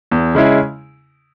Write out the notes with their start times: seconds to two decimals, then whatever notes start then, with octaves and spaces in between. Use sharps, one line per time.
0.11 E2
0.35 C#3 G#3 C#4 E4